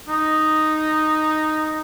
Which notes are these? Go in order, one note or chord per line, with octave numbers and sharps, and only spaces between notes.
D#4